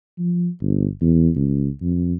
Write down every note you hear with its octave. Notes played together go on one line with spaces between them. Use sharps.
F3
G1
E2
C#2
F2